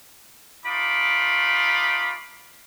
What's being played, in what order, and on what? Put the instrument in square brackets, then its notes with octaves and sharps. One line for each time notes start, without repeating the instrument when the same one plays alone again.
[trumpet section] A3 D#4 F4 B5 D6